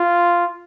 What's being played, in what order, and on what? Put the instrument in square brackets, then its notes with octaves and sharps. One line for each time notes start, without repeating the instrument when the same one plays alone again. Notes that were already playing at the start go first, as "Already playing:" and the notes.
Already playing: [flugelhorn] F4